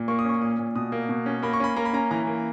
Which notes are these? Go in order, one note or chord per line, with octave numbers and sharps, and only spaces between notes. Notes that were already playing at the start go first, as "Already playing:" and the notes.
Already playing: A#2
A#3 C#6
D#6
C#4 C#6
A#2 D#6
A#2
B2 D#6
A#3
B2
C#4
A#3 B5
C#6
C#4 B5
A#3 A#5
B5
C#4 A#5
E3 A#5
A#3